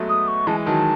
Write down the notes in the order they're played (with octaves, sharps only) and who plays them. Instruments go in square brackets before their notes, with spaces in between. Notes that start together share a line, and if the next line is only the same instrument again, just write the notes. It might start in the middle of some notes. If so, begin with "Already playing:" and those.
Already playing: [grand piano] F#3 G#3 A3 B3
[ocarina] D#6
C#6
[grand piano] E3 G#3 [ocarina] A5
[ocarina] G#5
[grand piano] D#3 F#3 [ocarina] A5